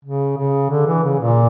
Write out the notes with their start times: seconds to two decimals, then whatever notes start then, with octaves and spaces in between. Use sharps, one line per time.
0.05 C#3
0.37 C#3
0.70 D3
0.87 E3
1.03 C#3
1.20 A#2